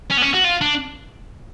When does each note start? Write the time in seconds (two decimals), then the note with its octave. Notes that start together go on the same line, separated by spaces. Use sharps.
0.11 C#4
0.18 B3
0.22 C#4
0.34 F#4
0.44 F4
0.61 D4